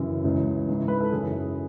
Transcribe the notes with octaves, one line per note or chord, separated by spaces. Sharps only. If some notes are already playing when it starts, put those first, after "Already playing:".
Already playing: F#2 C#3 E3
C#2 C#3 E3
G#2 E3
B4
A4
F#2 C#3 E3 G#4